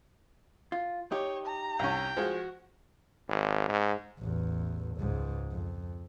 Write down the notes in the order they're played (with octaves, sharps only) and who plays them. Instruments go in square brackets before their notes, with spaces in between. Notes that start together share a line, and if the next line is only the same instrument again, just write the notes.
[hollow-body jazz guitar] F4
[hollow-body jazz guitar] D#4 G4 [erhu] C#5
[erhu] A#5
[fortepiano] C2 C#4 [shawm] G5
[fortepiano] F3 G#3 [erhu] F#4
[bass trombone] G#1
G#2
[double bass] A1 E2
C#2 G#2
F2